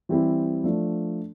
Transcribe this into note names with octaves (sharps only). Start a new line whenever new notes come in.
E3 G3 C4 E4 G4
F3 A3 D4